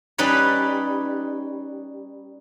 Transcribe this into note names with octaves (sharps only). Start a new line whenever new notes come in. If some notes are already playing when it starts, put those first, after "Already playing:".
G3 C#4 D#4 B4 C#5